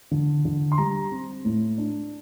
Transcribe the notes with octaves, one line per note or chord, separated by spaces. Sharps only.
D3
D3
C6
G3 A#5
C4
A2
D4